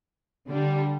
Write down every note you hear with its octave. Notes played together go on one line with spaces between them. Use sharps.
D3 G3 D4